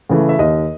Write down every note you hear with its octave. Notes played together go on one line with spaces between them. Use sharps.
C#3 E3 A3
E5
D#2 D#5